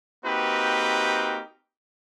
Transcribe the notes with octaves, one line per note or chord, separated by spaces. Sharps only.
A#3 C4 D#4 F#4 G4 B4